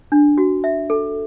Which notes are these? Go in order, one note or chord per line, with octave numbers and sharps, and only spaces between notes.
D4
F#4
E5
A4